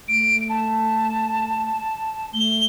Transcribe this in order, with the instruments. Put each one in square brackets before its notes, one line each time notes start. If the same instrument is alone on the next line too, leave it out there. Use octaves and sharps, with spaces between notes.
[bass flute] A3 [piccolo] D7
[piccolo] A5
[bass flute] A3 [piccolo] G7